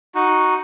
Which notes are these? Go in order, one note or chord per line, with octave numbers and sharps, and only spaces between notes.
D#4 F#4